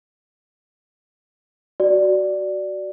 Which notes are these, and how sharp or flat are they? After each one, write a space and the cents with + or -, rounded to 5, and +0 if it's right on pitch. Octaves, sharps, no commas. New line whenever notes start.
F#4 +15 D5 +0